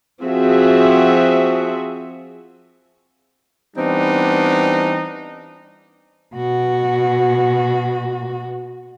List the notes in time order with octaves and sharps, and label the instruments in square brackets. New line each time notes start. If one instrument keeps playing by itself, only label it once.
[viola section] F3 C4 F#4 G#4 E5
[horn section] E3 G3 B3 C4 D4 D#4
[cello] B2 F#4